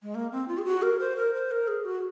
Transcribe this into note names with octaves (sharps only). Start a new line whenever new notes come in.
G#3
A#3
C4
F4
G#4
F#4
A#4
C5
A#4
C5
A#4
G#4
F#4